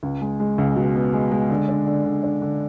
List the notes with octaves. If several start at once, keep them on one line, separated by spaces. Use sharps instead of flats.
C#2
G#3
G#3
C#2
B2
B3
G#3
G#3
D3
D4
D3
D3
D4
D3